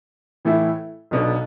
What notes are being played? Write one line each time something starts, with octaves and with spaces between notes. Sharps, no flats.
A2 E3 A3 E4
B1 B2 B3 D4 A4